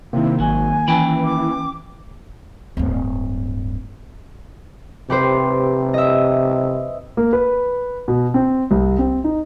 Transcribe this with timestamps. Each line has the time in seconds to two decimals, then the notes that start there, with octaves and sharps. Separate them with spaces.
0.13 C3 D#3 A#3 E4
0.40 G#1 F#3 G#5
0.88 E3 C#4 G5 B5
1.24 D6
2.77 D1 G2
5.10 C3 G4 B4 C5
5.94 D#5 E5
7.17 A#3
7.33 B4
8.08 B2
8.34 C4
8.71 C2
8.99 C4
9.24 D#4